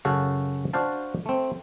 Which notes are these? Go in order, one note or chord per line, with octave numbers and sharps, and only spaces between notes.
F#2 C#3 F#4 A4 F5
D4 F#4 C5 F5 A5
A3 C4